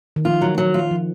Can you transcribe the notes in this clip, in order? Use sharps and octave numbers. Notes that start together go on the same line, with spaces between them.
D#3
F3 F4
F#3
F#3
F4
F3